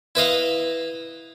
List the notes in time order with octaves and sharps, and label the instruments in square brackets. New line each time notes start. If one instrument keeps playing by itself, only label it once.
[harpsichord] E4 B4 D#5 F5